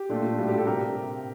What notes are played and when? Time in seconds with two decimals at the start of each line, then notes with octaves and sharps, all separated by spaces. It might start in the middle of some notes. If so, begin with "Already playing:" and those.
Already playing: G4
0.09 A#2 A3 D4 F4
0.38 A2 G3 D4 F4
0.49 G4
0.58 A4
0.67 C3 G4 A#4